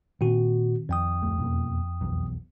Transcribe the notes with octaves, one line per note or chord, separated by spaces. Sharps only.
A#2 D#3 C4 F#4
F2 G5 D#6
D1 A3
E2 B2 A#3
B1 E2